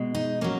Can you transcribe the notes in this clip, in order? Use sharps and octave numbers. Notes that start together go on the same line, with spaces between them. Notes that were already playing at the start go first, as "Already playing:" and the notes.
Already playing: B2 G#3
D#4
F#3 A#3 C#4